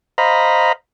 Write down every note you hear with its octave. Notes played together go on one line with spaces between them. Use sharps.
C5 D#5 F5 A#5 B5